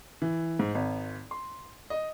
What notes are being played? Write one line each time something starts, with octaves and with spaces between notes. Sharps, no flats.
E3
G#2
G#1
C6
D#5